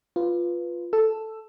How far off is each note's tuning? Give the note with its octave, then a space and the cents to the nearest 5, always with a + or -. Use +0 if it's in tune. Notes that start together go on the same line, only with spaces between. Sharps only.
F4 +0 B4 +0
A4 +0 E6 +10